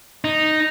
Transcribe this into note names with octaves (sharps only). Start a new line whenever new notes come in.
D#4